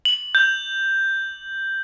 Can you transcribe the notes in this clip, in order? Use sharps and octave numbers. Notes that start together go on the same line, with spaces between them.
F#7
G6